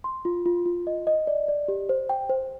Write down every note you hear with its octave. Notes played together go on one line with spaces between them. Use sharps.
C6
F4
F4
F4
D#5
D#5
D5
D5
G4
C5
G5
C5